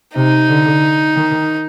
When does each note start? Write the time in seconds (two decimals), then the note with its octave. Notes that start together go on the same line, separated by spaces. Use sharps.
0.15 C3 D#4
0.49 D3
1.16 D#3